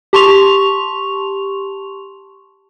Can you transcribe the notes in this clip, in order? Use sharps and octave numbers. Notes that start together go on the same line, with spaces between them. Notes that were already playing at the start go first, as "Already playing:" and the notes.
G4 A5 C6 C#6 F7